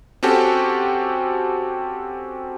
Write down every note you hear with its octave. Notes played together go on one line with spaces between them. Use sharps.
C4 C#4 F#4 G4 A4